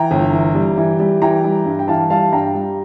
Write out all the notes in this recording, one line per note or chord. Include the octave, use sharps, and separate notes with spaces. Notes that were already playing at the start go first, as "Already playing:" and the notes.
Already playing: E3 G5 A#5
G1
E3
G3
E3
G3
E3 G5 A#5
G3
G2
G5
E3 F5 A5
G3 F5 A5
G2 G5 A#5
G3